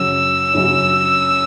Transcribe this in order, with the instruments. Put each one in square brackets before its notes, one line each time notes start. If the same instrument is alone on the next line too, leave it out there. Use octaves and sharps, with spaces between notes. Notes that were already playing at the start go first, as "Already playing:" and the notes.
Already playing: [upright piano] F#2 C#3 F#3 C#4 [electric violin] E6
[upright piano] F#2 C#3 F#3 C#4